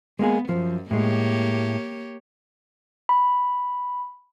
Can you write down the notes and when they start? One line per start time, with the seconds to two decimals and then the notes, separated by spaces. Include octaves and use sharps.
0.19 G#3 A#3 B3 G#4
0.49 F#2 F3
0.91 A2 G#3 A#3 G4 C#5
3.09 B5